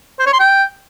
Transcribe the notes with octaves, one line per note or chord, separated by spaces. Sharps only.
C5
C#5
C6
G5